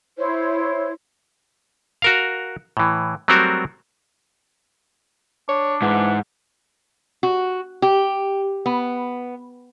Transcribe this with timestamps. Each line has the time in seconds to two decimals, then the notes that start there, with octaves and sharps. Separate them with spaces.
0.17 E4 C5 C#5
2.02 F#4 A#4 F5
2.77 A2 E3
3.28 F#3 G3 A3 C4 F#4 A#4
5.49 D4 C#5
5.82 G#2 E3 F#5
7.23 F#4
7.82 G4
8.66 B3